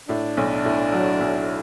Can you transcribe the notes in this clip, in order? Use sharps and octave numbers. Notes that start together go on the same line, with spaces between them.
A2 D4
B1
A2
F#3
B1